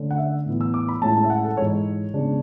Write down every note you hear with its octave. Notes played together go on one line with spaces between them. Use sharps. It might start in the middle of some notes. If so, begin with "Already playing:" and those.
Already playing: D3 A3 C#4
F#5
E5
A2 E3 B3
E6
D6
B5
A2 G#3 C#4 E4 A5
A5
E5
F#5
A4
G#2 E3 G#3 C#5
C#3 G#3 B3 D4